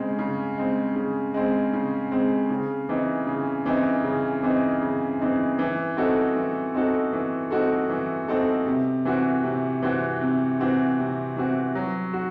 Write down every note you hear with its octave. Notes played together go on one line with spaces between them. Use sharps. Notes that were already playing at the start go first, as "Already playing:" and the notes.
Already playing: C#3 G#3 C4
C#3
G#3 C4
C#3
G#3 C4
C#3
G#3 C4
C#3
E3 C4 D#4
C#3
E3 C4 D#4
C#3
E3 C4 D#4
C#3
E3 C4 D#4
E3
C4 D#4 F#4 A4
E3
C4 D#4 F#4 A4
E3
C4 D#4 F#4 A4
E3
C4 D#4 F#4 A4
C3
E3 C4 F#4
C3
E3 C4 F#4
C3
E3 C4 F#4
C3
E3 C4 F#4
F#3
F#4